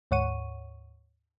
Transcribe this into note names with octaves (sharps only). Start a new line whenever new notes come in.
D2 G#2 C#5 F#5 C#6 D#7